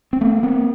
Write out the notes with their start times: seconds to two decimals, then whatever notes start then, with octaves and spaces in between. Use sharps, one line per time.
0.13 C4
0.21 A3 B3
0.43 A#3 C4